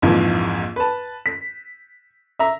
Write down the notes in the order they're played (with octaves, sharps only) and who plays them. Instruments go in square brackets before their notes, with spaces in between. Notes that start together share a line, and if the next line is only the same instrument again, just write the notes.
[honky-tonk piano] A#1 F2 G#2 E3 F3
B4 A5
B6
E5 A#5